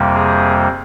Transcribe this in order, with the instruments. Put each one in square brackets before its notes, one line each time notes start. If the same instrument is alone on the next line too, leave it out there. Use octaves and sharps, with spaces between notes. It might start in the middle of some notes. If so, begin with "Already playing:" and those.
Already playing: [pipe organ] F2 C3 G3 A#3
G#4